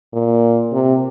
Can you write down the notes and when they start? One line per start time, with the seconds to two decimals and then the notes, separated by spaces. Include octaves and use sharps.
0.13 A#2
0.72 C3